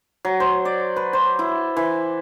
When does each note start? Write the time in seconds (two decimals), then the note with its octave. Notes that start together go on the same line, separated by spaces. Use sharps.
0.25 F#3
0.40 C5
0.65 D5
0.96 B4
1.13 C5
1.39 E4
1.77 E3